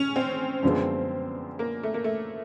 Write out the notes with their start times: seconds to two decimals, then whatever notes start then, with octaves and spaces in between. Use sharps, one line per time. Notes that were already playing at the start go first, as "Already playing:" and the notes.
Already playing: C#4
0.16 C4
0.63 F#2 D3 F3 G#3 B3
1.59 A#3
1.83 A3
1.94 A#3
2.04 A3